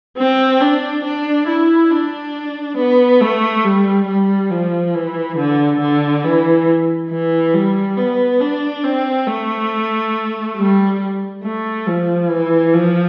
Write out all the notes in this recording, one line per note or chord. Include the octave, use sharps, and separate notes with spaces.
C4
D4
D4
E4
D4
B3
A3
G3
G3
F3
E3
D3
D3
E3
E3
G3
B3
D4
C4
A3
G3
A3
F3
E3
F3